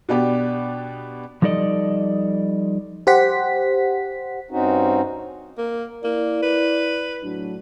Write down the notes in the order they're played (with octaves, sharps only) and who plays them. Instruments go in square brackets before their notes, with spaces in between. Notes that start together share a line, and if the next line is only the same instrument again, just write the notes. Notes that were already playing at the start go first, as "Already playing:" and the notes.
[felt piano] B2 B3 D4 G4
[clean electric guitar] F3 G3 D#4 A4 D5 D#5
[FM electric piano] G4 C5 F#5 B6
[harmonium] G2 C4 C#4 D#4 F#4
[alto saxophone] A#3
[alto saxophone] A#3 [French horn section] E4 D5
[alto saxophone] B4
[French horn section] A2 F#3 D4